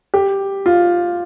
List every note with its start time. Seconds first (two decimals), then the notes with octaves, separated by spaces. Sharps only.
0.14 G4
0.66 F4